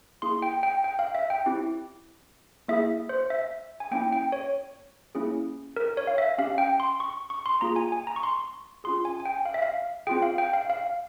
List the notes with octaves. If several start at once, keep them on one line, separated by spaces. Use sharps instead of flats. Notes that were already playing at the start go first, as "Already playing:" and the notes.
A#3 E4 G#4 C6
G5
G5
G5
F5
E5
G5
C4 E4 G4
A#3 E4 G#4 E5
C5
E5
G#5
A#3 C#4 E4 G5
G5
C#5
A#3 C#4 E4 G#4
A#4
C#5
F5
E5
C#4 G4 F5
G5
C6
C#6
C#6
C6
A#3 F4 G#4 A#5
G#5
G#5
A#5
C#6
C6
C#4 F4 G#4 C6
G#5
G#5
G5
F5
E5
F5
C4 F4 G#4 G5
F5
G5
F5
F5